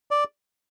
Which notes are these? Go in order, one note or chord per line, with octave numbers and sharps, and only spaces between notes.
D5